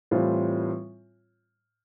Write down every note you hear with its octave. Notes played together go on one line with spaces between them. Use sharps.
A2 E3 G3 C4 F4